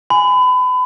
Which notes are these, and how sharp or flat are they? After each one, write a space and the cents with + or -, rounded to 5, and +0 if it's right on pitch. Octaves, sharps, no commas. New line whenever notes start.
G#5 +0 B5 +30